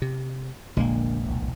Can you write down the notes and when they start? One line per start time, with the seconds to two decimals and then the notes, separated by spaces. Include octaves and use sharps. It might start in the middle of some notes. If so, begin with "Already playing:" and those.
0.02 C3
0.77 F1 A#1 A#2 D3 G#3 A#3
1.22 E1 C2